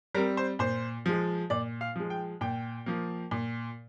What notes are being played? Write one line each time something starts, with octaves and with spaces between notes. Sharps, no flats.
G3 C4 A#4
C5
A#2 C5
F3 G#3
A#2 D5
F5
F3 G#3
G5
A#2 G5
F3 A#3
A#2